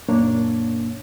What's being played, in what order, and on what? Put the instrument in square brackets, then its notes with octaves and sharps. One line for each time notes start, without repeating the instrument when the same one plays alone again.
[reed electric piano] F#2 A#2 A#3 D4 C#5